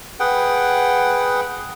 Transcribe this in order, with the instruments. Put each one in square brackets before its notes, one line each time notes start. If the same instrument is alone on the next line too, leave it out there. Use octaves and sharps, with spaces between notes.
[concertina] G#4 B4 F#5 G5